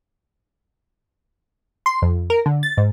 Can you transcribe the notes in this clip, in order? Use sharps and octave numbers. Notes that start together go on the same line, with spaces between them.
C6
F2
A#4
D3
A6
G#2